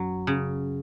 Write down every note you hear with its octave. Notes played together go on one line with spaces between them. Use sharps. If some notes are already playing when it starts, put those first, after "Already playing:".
Already playing: F#2 F#3
C#3